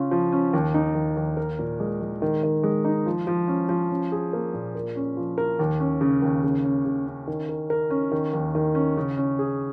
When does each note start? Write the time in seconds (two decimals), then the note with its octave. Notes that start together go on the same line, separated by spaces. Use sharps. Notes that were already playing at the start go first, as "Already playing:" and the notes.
Already playing: C#3 C#4 F4
0.11 F3
0.32 C#4
0.53 D#2
0.74 D#4
0.95 D#2
1.17 D#2
1.37 A#4
1.59 A#2
1.80 G#3
2.01 G#3
2.22 D#3
2.43 D#3
2.63 G#3
2.85 D#4
3.06 F3
3.27 F3
3.48 C#4
3.69 F3
3.90 C#4
4.12 G#4
4.33 A#3
4.54 A#2
4.75 A#4
4.96 C#4
5.17 F3
5.38 A#4
5.59 D#2
5.80 C#4
6.01 C#3
6.22 D#2
6.43 C#3
6.65 C#4
6.85 C#3
7.07 C#4
7.27 D#3
7.49 A#4
7.70 A#4
7.90 C#4
8.12 D#3
8.33 D#2
8.55 D#3
8.75 C#4
8.97 C#3
9.18 C#4
9.39 G#4